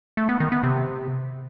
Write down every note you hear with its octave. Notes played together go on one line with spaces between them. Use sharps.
A3
B3
D#3
B3
C3